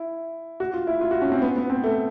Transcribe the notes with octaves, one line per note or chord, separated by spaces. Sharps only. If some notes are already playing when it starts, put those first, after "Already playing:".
Already playing: E4
F#4
F4
E4
F4
F#4
C#4
C4
B3
B3
C4
A3